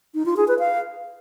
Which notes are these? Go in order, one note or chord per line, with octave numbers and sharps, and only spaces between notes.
D#4
F4
G#4
B4
F5